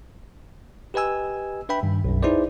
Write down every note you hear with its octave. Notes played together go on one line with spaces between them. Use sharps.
G4 B4 D#5 G#5 E6
D4 B4 E5 G5 B5
G2 D#3
B1 F#2
D#4 E4 G#4 B4 C5 D5